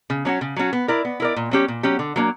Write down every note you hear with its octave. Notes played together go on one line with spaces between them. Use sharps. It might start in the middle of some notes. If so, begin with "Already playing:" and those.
C#3
F#3 C#4 F#4
C#3
F#3 C#4 F#4
B3
E4 A#4 D5
B3
E4 A#4 D5
A#2
F#3 C#4 G4
A#2
F#3 C#4 G4
D3
F#3 A#3 D4